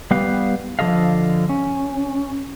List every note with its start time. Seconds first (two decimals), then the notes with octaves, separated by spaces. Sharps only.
0.11 G3 B3 G4 B4 F5
0.79 D3 F3 F#4 A4 D#5 F5
1.49 C#4